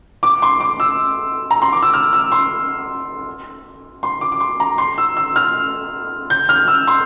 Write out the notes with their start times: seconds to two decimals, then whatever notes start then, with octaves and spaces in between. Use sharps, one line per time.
0.23 D6
0.42 C6
0.61 D6
0.80 E6
1.51 A#5
1.62 C6
1.73 D6
1.83 E6
1.94 F6
2.13 E6
2.32 C6
4.03 C6
4.21 D6
4.32 D6
4.40 C6
4.60 A#5
4.78 C6
4.98 E6
5.17 E6
5.36 F6
6.30 G6
6.49 F6
6.68 E6
6.87 C6